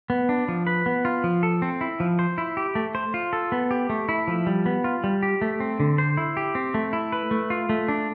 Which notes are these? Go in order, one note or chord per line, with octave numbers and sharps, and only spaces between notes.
B3
D4
F3
B4
B3
F4
F3
A4
C4
E4
F3
C5
E4
G4
A3
C5
F4
A4
B3
G4
A3
E4
F3
G3
B3
F4
G3
G4
A3
C4
D3
C5
E4
G4
C4
A3
E4
B4
A3
F4
A3
D4